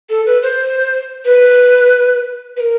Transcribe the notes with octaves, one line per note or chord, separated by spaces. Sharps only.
A4
B4
C5
B4
B4
A#4